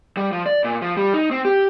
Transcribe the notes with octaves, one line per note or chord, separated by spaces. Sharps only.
G3
F3
D5
A#2
F3
G3
D#4
C4
G4